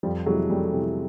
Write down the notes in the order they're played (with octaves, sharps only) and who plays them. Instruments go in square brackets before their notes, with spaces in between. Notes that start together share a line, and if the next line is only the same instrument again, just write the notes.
[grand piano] F2 F3 G3
C3 E3 F#3 G#3
F2 G3 A3
C3 E3